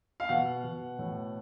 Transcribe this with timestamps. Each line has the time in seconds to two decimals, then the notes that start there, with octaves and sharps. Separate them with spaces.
0.20 F5
0.29 B2 F#5
0.64 B2
0.99 A2